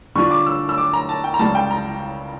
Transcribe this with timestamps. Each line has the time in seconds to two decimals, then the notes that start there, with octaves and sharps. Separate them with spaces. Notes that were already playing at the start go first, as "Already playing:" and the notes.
0.15 D3 G3 D4 F4 C#6
0.31 D6
0.46 E6
0.69 E6
0.78 D6
0.93 A#5
1.09 A5
1.24 G5
1.34 A#5
1.39 C#2 C#3 G3 A5
1.55 G5
1.71 A#5